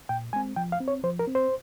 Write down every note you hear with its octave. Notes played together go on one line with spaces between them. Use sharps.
A#2 G5
G#3 C4 G#5
F3 G5
F5
C4
C#5
F3 C5
A#4
C4
C5